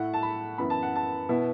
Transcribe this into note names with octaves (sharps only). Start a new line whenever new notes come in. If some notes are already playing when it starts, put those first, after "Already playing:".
Already playing: A2 A3 E4 F#5
A5
B5
F#2 E3 B3 E4 B5
A5
F#5
A5
B2 B3 E4